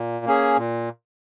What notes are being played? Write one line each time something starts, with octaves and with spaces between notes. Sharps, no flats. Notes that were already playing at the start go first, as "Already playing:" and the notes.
Already playing: A#2
A#3 C#4 G#4
A#2